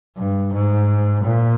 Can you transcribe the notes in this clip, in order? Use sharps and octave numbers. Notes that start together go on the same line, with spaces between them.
G2
G#2
A#2